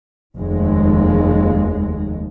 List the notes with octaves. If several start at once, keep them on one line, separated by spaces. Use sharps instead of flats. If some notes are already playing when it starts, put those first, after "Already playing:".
F1 D#2 G#3